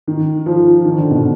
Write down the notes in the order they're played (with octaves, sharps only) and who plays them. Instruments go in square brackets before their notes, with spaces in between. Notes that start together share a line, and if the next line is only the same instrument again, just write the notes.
[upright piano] D#3
F3
D#3
D3
B2